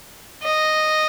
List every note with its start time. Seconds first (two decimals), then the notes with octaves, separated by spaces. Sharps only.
0.43 D#5